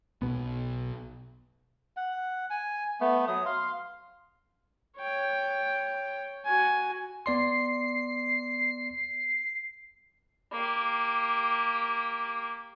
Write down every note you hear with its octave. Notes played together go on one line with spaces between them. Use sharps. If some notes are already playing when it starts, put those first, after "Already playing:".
B1 E2 B2 B3
F#5
G#5
A3 B3
F#3 D#6
F5 C6
C#5 G5
F#4 G#5
B3 D5 C6 C7
A#3 G4